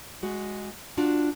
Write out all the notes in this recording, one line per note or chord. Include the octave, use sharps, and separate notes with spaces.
G#3 F#4
D4 F4 F#4